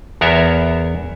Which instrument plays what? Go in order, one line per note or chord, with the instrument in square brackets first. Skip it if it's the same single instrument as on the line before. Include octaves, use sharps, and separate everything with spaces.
[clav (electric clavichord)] E2 B3 A#4 C#5 E5